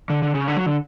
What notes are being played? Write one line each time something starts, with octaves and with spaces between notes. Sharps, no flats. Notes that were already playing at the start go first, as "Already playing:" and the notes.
D3
D3
C#3
D3
F#3
D3